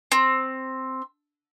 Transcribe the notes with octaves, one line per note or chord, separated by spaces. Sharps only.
C4